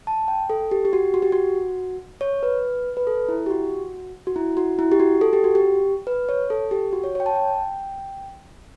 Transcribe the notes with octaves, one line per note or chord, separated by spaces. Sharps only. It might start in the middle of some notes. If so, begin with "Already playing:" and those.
A5
G5
A4
G4
G4
F#4
F#4
G4
F#4
C#5
B4
B4
A4
E4
G4
F#4
F#4
E4
F#4
E4
G4
F#4
A4
G4
F#4
G4
B4
C#5
A4
G4
F#4
C#5
C#5
G5
A5
G5